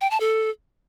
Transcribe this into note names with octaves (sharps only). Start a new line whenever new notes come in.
G5
A5
A4